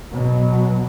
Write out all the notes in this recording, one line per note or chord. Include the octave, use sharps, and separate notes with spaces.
B2 F#3